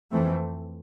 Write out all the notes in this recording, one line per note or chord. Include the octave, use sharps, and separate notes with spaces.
F2 E3 A3 C4